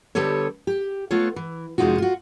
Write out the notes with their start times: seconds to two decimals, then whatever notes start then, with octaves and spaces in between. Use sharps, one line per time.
0.15 D3 G3 B3 G4 A4 C#5
0.67 G4
1.11 A3 B3 F4 C#5
1.36 E3
1.78 F2 C3 G#3 D#4 F4 F#4
1.98 F4 F#4